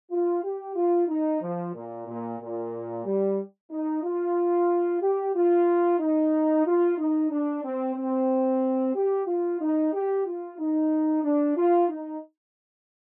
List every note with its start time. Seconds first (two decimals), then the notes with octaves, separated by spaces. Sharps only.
0.11 F4
0.43 G4
0.76 F4
1.08 D#4
1.41 F3
1.74 A#2
2.07 A#2
2.40 A#2
3.05 G3
3.71 D#4
4.03 F4
5.01 G4
5.34 F4
5.99 D#4
6.66 F4
6.98 D#4
7.30 D4
7.64 C4
7.96 C4
8.95 G4
9.27 F4
9.60 D#4
9.93 G4
10.26 F4
10.58 D#4
11.23 D4
11.56 F4
11.88 D#4